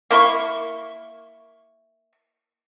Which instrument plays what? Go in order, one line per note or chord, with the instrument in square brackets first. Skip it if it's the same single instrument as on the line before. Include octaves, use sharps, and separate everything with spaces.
[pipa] A#3 E4 C6 C#6